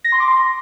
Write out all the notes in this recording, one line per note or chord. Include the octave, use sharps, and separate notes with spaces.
A#6
C6
D6
C6